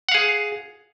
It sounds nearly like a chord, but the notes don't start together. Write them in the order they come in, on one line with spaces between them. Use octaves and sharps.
F#5 F5 G#4